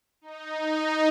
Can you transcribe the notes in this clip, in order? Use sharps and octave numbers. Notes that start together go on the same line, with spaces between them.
D#4